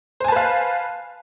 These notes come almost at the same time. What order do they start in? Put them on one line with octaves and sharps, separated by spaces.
C5 G#5 A5 B4 F5